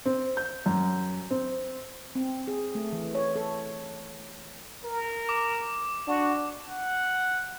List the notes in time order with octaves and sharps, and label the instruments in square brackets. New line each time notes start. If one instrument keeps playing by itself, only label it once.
[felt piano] C4
G6
F#2
C4
[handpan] C4
G#4
A3
E3
C#5
A4
[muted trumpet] A#4
[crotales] D6
[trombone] D4 [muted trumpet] F#4
[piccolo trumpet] F#5